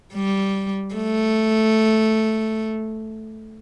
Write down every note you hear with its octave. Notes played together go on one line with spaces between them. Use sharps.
G3
A3